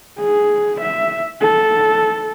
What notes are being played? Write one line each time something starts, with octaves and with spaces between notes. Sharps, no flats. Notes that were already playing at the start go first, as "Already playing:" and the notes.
G#4
E5
A4